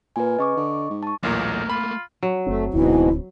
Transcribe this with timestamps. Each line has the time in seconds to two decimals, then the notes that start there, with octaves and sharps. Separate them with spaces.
0.16 A#2 B4 G#5
0.38 C#3 D#5 C#6 D6
0.57 D3
0.90 G#2
1.03 A5 C#6
1.23 B1 E2 A#2 A3 A#3 A#4
1.70 F4 B5
2.23 F#3
2.46 F#1 A3 C4
2.73 D1 G#2 B2 D3 E3 C4 E4